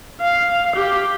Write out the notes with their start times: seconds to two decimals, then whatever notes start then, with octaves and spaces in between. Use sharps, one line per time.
0.21 F5
0.76 G4